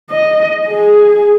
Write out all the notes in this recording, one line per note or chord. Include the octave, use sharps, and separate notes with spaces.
D#5
G#4